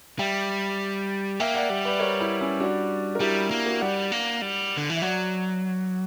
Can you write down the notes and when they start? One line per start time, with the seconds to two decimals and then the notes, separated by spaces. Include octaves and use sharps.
0.19 G3 E5 G5
1.40 A#3 E5 G5
1.54 D5 F#5
1.70 G3
1.85 B4 D5
2.00 A#4 C#5
2.20 E4 G4
2.41 C#4 E4
2.60 D4 F#4
3.15 A#4
3.20 G3 E4 G4
3.51 A#3
3.66 F#4 A#4
3.81 G3 D5 F#5
4.12 A#3
4.42 G3
4.77 D3
4.90 E3
4.96 E5
5.02 F#3 D5 F#5